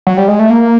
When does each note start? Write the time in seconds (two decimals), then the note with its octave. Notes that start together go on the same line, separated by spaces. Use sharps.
0.07 F#3
0.17 G3
0.28 G#3
0.39 A3
0.50 A#3